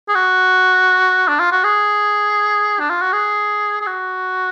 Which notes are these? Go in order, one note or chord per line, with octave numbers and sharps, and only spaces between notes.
G#4
F#4
D4
F4
F#4
G#4
D4
F4
F#4
G#4
G#4
F#4